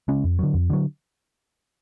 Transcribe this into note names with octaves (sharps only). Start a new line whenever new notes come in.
C#3 G#3 C#4
F2
D3 F#3
F2
D3 F#3